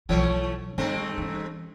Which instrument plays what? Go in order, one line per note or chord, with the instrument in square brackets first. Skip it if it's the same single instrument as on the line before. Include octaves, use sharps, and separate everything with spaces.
[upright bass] B1 F#3 [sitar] E3 A3 C#5
[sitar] G2 A3 C4 [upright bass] D#3
[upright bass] E3 C#4